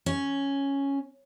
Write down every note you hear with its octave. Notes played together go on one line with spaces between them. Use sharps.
C#4